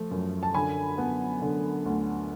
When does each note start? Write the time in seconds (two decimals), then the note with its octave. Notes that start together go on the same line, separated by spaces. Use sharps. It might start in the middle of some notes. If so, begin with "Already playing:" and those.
Already playing: F3 A3
0.11 F#2
0.43 A5
0.54 D3 G#5 B5
0.98 B3
1.42 D3
1.85 D2